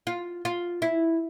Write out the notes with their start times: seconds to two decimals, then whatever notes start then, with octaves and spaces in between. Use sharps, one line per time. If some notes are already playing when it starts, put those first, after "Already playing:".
0.07 F4
0.45 F4
0.82 E4